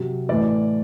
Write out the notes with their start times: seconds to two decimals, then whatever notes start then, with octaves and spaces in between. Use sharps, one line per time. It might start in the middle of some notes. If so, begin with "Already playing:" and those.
Already playing: C3 F#3
0.29 A2 E3 D5